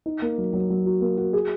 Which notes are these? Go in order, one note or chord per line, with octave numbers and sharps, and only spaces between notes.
D#4
A#3
F#3
F#3
F#3
F#4
A#3
F#4
G#4